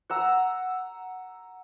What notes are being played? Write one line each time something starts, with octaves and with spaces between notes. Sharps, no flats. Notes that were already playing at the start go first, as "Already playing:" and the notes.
F#5 A#5 E6